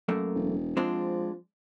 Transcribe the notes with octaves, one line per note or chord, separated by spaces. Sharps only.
F#2 A3 A#3
E1
F3 G#3 C4 D4